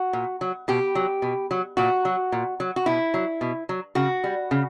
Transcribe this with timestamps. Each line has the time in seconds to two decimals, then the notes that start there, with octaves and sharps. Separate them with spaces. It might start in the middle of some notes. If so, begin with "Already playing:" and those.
Already playing: F#4
0.13 A#2
0.41 F#3
0.68 B2 G4
0.95 F#3
1.22 B2
1.51 F#3
1.77 A#2 F#4
2.05 F#3
2.32 A#2
2.60 F#3
2.76 F#4
2.86 B2 E4
3.14 F#3
3.41 B2
3.69 F#3
3.95 C#3 F#4
4.24 G3
4.51 C#3